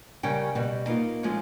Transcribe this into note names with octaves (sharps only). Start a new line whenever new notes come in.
C#3 G3 C#4 A#4 G5
B2 G3 B3
A#3 D#4 F4
F3 G#3 A3 C#4